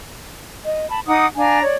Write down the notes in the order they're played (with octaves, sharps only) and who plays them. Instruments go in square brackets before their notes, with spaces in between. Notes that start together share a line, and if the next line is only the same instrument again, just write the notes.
[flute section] D#5
A5 B5
D#4 F#5 D6 D#6
D4 F5 G#5 A#5
C#5 D5